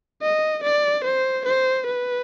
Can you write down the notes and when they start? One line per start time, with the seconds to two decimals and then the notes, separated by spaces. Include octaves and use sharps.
0.22 D#5
0.63 D5
1.04 C5
1.45 C5
1.86 B4